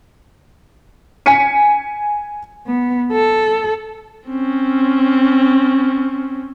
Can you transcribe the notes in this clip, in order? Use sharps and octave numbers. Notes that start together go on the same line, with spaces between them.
G#5 B6 C#7 D#7
B3
A4
C4 C#4